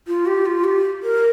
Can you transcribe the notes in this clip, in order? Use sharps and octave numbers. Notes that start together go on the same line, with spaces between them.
F4
G4
F4
G4
A#4